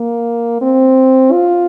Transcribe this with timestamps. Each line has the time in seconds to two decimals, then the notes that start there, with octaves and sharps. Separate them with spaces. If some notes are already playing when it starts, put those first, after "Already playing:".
Already playing: A#3
0.61 C4
1.32 F4